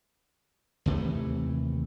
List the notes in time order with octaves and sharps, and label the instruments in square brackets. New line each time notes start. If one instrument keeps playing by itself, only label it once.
[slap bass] D#2 C3 E3 A3